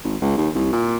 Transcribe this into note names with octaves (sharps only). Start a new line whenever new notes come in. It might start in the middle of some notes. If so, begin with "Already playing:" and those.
G#1
C#2
D#2
C2
A#2